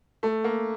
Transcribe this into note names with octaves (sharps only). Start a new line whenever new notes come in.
A3
A#3